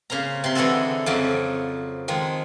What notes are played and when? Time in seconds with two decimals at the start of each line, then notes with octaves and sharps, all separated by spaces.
0.10 C#3 A#3 C5 A#5
0.44 C3 C6
0.55 D3 E3 G#3 D#4 F#4 A4
1.06 F2 C#3 F#3 D5 A5
2.08 D#3 F3 G#3